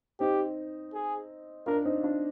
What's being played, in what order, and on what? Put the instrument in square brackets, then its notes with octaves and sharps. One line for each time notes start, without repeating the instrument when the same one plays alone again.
[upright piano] C4 D#4 [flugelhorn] G4
[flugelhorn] G#4
[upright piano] D4 F4 [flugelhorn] A#4
[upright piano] C4 D#4
D4 F4